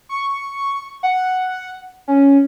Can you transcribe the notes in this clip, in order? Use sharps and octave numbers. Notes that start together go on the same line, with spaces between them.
C#6
F#5
C#4